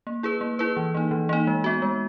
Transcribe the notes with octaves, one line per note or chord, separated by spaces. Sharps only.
A#3
E4 G#4 B4
A#3
E4 G#4 B4
E3
A#3 D#4
E3
A#3 D#4
G#3
B3 F#4
G#3